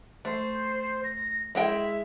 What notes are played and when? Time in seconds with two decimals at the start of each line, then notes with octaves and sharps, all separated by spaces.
0.25 A3 C5
1.04 A#6
1.55 G#3 E4 E5 G5